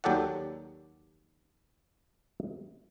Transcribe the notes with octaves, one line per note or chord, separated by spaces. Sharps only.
D#2 F#3 G4 A4 D5 F#5